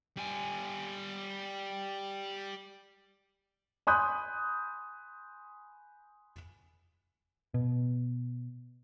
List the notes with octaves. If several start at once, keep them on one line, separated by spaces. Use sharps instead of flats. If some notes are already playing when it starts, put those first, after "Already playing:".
G3 G#5
G#5 B5 C6 D#6 F#6 G6
B2